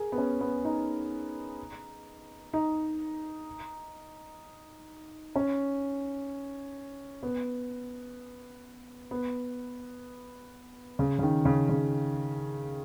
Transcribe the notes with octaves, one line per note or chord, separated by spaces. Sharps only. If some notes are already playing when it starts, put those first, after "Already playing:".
Already playing: G#4 A#4
B3
C#4
B3
D#4
D#4
C#4
B3
B3
C#3
C#3
D#3
C#3
C#3